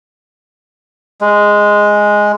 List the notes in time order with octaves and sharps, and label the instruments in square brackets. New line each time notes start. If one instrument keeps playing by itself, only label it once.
[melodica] G#3